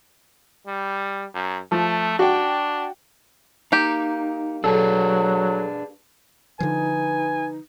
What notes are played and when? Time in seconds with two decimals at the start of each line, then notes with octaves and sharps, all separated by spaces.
0.67 G3
1.34 F#2
1.72 F3 A3
2.19 D4 F#4 G5
3.72 A#3 D#4 G4
4.64 F#3 D4 G#4 A4 B4
6.60 D3 F3 D#4 B4 G#5